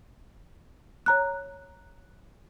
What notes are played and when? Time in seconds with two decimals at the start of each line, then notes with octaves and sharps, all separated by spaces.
1.06 C#5 A#5 F#6